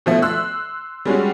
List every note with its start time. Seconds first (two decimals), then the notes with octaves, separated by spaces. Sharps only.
0.06 B2 F3 A3
0.22 C6 E6 F#6
1.05 G3 G#3 C#4 F#4